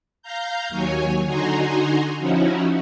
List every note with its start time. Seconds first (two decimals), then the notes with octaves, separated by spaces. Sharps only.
0.22 F5 A#5 G6
0.69 D#2 F#3 C#5 G#5
1.26 D3 D#4 F#4 G#5 A#5 C6
2.19 F3 C#4 D#4 E4 F#4